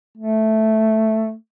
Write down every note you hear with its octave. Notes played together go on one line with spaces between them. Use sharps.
A3